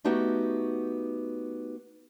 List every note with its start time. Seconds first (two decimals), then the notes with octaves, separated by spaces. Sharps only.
0.04 A3 B3 D#4 F#4 G4